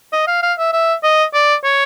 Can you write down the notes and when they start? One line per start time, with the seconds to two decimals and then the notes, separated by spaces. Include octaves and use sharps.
0.12 D#5
0.27 F5
0.43 F5
0.58 E5
0.73 E5
1.03 D#5
1.34 D5
1.64 C#5